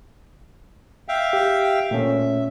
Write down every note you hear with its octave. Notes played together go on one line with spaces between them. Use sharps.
E5 F5 G5
G4
A#2 A3 C#4 E5